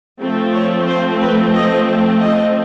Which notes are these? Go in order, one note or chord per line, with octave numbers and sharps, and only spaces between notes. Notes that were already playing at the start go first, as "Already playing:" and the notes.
F3 A3 C4
C#5
C5
B4
D#5
D#5